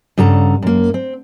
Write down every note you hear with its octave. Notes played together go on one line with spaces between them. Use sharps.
G2 C#3 A4 F#5 A#5
F#2 A#3
C4